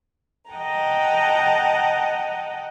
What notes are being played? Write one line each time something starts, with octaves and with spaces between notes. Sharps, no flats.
D#5 F#5 G5 A5 A#5